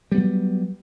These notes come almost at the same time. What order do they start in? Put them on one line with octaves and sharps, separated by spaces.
G3 B3 F#3